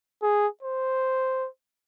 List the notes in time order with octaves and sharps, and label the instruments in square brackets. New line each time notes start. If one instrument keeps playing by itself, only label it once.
[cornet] G#4
C5